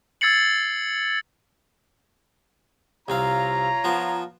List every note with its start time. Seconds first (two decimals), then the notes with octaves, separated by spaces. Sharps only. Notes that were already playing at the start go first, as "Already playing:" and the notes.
0.21 E6 G#6 A6 C7 C#7 F#7
3.08 C2 C4 F4 C#5 F5 A#5
3.84 F3 B3 C5